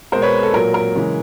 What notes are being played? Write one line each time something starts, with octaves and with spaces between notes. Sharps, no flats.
B2 G#3 A#4 C5
B4 C#5
A4
A#2 F#3 A#4
A#4
C#3 E3 G#3